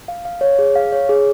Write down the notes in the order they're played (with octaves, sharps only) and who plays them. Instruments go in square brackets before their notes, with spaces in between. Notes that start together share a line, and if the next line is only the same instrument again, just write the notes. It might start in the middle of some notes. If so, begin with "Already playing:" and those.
[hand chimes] F5
F5
C#5
G#4
F5
C#5
G#4